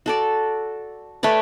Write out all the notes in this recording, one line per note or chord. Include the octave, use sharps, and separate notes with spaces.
F#4 A4 D5
A3 B4 C#5 D5